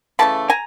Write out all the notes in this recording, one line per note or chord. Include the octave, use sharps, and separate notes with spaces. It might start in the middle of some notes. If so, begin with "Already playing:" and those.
C#3 E3 A3 A5 B5
G#5 A#5